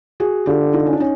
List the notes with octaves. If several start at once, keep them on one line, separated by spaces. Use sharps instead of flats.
F#4 G#4
D3 F4 G4
D#4 F4
C#4
D4
C#4 D#4